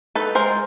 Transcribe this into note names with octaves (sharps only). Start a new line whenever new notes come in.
D#4 A4 B4
G#3 A#4 C5